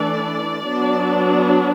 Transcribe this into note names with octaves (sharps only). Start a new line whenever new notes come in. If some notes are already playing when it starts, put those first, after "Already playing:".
Already playing: E3 A3 D4 D5
F#3 B3 D4